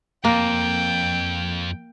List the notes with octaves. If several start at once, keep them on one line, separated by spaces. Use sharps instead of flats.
F2 A#3 G5